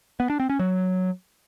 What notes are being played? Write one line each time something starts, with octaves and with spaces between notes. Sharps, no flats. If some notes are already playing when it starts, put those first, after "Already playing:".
B3
D4
C4
C#4
F#3